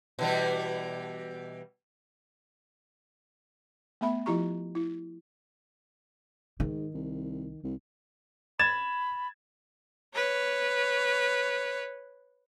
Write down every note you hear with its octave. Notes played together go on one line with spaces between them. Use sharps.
B2 E3 G3
A3 B3 E5 B5
F3 E4 F4 G4 A#5 C#6
E4
G#2 D#3
C2
C2
B5 G#6 A6 E7
B4 C#5